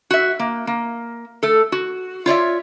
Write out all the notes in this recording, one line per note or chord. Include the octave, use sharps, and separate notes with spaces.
F#4 E5
A#3
A#3
A3 A4
F#4
F4 C#5 D5 E5